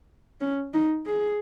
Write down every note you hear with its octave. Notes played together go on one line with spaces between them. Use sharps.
C#4
D#4
G#4